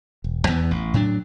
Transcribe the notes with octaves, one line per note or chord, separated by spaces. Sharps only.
E1
E2 E3 B3
A1
A2 F#3 D4